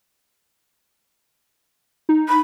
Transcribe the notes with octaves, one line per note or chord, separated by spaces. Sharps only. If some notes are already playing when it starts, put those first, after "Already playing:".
D#4
B5